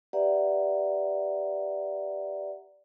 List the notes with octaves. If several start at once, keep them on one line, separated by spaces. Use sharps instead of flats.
G4 B4 D5 E5 F#5 A#5